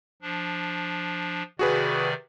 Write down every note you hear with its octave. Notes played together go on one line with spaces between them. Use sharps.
F3 D4
C3 D#3 F#4 G#4 B4 D5